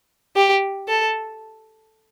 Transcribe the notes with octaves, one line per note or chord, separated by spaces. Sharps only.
G4
A4